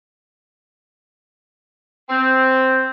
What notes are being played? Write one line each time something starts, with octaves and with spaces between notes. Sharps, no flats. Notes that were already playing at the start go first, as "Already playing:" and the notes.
C4